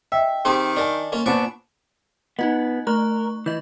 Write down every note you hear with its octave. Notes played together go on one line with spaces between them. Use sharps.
D#5 E5 G5
D#3 C4 G4 G#4 C6
D4 A#4 D#5 G#5
A#3 C#4 F4
A#2 B3 D4 C5 G#5 A5 C#6 E7
B3 D#4 F4 D#5
A3 A#4 C#6 F#6
E3 D#5 G6